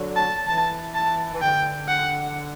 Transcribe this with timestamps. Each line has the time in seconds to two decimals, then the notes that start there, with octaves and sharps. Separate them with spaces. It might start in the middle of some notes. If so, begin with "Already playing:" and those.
Already playing: D3 F#3
0.16 A5
0.47 E3 A5
0.94 A5
1.34 E3
1.41 D3 G5
1.89 F#5